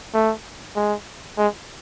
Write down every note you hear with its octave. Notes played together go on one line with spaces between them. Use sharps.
A3
G#3
G#3